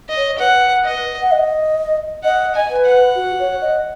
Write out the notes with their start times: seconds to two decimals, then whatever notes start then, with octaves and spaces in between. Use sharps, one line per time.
0.09 D#5
0.16 C#5
0.39 B4 F#5
0.85 D#5
1.21 F#5
1.31 D#5
2.24 D#5 F#5
2.55 G#5
2.69 B4
2.85 F#5
3.15 F#4
3.39 C#5
3.61 D#5